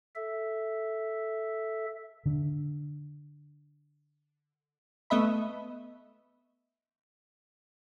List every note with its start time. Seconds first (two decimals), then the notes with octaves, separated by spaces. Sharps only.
0.15 A4 E5
2.26 D3 D4
5.10 A3 B3 D#5 E5 B5